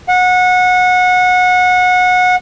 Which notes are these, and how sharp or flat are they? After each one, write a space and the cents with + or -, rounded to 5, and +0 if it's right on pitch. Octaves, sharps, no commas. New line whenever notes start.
F#5 -25